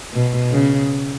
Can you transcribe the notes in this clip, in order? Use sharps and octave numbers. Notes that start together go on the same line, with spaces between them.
B2
C#3